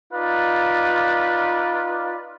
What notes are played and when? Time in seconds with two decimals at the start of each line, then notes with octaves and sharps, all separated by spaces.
0.13 D#4 F4 B4 D5